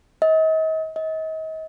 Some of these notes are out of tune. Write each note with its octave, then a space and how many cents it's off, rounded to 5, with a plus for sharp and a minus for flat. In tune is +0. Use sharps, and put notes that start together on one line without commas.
D#5 +40
D#5 +35